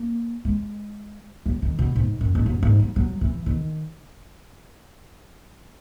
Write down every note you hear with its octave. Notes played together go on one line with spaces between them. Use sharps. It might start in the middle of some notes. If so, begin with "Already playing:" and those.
Already playing: A#3
G#3
F#3
D#3
B2
G#2
F#2
G#2
F#2
G#2
F#3
F#3
E3
D#3